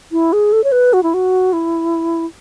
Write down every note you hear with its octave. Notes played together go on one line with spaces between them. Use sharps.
E4
G#4
A4
C#5
B4
F#4
E4
F#4
E4